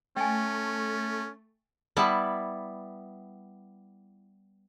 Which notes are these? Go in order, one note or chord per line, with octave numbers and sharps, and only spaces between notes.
A3 C#4 G5 G#5
G3 B3 E4 A5